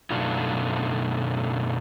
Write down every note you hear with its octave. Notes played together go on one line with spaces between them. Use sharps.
F#2 B2 A3 D4 D#4 F4